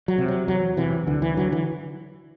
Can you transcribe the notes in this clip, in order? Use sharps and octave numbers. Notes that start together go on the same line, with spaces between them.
F#3
C3
F#3
E2 F#3
C3 E3
D2 D3
E3
D3 F#3
E3